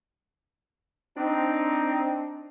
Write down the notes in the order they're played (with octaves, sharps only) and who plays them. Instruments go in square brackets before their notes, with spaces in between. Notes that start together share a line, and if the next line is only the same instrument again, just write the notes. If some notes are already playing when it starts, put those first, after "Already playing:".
[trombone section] C4 D#4 [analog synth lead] D4